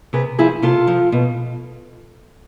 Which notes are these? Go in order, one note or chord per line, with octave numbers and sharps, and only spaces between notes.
C3 G#4 B4
F3 E4 G#4
C3 F4 A4
F3
B2